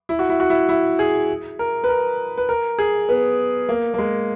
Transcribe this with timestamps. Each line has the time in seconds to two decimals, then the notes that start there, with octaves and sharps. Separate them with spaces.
0.09 E4
0.19 F#4
0.29 E4
0.40 F#4
0.50 E4
0.69 E4
0.99 G#4
1.59 A#4
1.84 B4
1.89 A#4
2.37 B4
2.49 A#4
2.79 G#4
3.09 B3
3.69 A#3
3.94 A#3
3.98 G#3